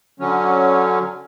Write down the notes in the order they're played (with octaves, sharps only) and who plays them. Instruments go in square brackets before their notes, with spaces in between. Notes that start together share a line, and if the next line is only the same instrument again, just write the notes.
[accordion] D3 F#3 C#4